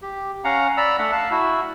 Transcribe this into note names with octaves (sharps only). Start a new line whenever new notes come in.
G4
C#4 F5 F#5 A#5
D5 A#5 B5 E6
A3 D4 E5 F#5
F5 A5
E4 F#4